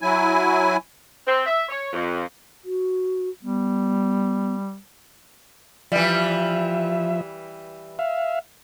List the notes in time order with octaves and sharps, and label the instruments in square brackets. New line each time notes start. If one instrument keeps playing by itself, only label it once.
[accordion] F#3 E4 G#5
[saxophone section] C4
E5
C#5
F2
[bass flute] F#4
[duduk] G3 [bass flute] B3
[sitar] E3 G3 [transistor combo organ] F3 E5
[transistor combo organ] E5 F5